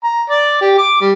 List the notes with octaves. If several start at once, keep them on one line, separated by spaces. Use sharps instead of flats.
A#5
D5
G4
D6
G3